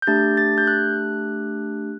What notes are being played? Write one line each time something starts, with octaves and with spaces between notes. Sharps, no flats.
G6
A3 D4 G4 A6
A6
G6
F#6